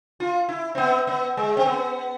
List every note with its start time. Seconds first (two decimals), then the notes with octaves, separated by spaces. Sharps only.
0.20 F4
0.49 E4
0.75 C4
0.78 B3
1.07 B3
1.37 G#3
1.57 C4
1.66 B3